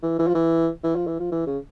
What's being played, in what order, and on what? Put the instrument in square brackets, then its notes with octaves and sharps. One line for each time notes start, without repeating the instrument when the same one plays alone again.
[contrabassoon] E3
E3
F3
E3
E3
F3
E3
F3
E3
C#3